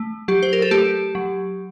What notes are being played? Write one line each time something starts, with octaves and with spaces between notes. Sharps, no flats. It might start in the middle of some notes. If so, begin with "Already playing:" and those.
Already playing: A3
F#3 G4
C5
A#4
A4
A3 G4
F#3